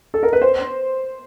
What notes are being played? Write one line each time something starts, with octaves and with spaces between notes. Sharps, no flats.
A4
A#4
B4
C5